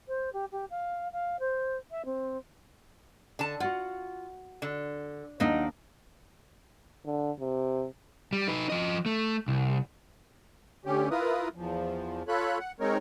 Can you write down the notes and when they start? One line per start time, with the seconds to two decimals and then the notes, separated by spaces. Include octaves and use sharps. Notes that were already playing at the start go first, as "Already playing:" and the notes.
0.08 C5
0.33 G4
0.52 G4
0.70 F5
1.12 F5
1.39 C5
1.91 E5
2.05 C4
3.39 D3 A5
3.60 F4 F#4 F#5
4.62 D3
5.40 D#2 F#3 A#3 D4 D#4
7.06 D3
7.40 C3
8.33 G3
8.48 D#4 B4
8.70 F3 D#5
9.06 A3
9.48 C2
10.85 D2 D3 C#4 G4
11.11 E4 F4 A#4 B4 D#6
11.55 E2 F3
12.28 F4 A4 C#5 B5 F#6
12.59 F#5
12.80 G#3 C4 D#4 A#4 C#5